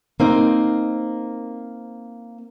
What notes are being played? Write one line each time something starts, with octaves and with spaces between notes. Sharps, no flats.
A#3 C4 D#4